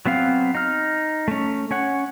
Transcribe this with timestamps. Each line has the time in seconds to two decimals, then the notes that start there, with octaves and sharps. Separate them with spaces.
0.06 F#3 B3 C4 F5
0.55 D#4 F6
1.28 A3 C#4
1.71 C#4 C#5 F#5